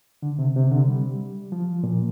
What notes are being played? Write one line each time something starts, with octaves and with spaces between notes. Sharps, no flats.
D3
C3
C3
D3
G3
F3
A#2